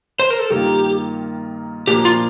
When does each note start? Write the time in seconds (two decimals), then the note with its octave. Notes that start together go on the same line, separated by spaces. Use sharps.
0.19 C5
0.30 A#4
0.39 A4
0.50 G2 D#3 A#3 F4 G4
1.87 A#2 F3 A#3 D4 G4
2.05 F4